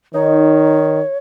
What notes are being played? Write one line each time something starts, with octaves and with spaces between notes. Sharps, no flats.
D#3 D#4 C#5